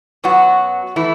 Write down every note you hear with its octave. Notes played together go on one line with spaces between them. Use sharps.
F#2 F#3 B3 F#4
E3 A3 E4